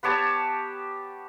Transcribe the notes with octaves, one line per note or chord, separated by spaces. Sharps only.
B3 G4 C#5 A5